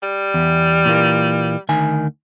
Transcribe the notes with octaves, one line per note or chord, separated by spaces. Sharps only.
G3
E2
A#2 E3 A#3
D2 D#3 G#5